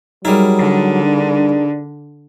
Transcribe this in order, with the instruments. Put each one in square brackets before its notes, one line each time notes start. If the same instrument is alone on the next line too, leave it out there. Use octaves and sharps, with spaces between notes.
[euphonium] F#3 [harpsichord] G3 E4 [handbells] D#4 G#4 A#4
[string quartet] D3
[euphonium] D4